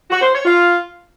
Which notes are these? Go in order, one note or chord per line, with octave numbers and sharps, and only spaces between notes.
F#4
C5
C#5
F4